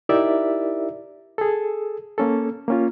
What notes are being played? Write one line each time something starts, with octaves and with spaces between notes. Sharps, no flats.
D#4 E4 G4 A#4 D5 E5
G#4 A4
A#3 C#4 A4
A#3 C#4 F4